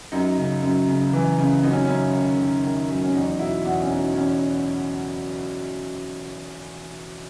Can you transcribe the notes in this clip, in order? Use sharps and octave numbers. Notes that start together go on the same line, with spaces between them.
F#2 D#4
C#3
F#2
C#3
E3
C#3
F#2 D#4
C#4
F#2 C#4
D#3
D#3
D#3
F#2
C#4
E2 D#4
B2 E4
E2 F#4
C#4
B2 D#4
E2 C#4